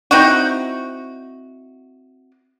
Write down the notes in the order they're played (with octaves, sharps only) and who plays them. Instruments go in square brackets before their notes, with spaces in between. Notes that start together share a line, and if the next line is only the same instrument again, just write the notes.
[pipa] C4 D#4 E4 F#4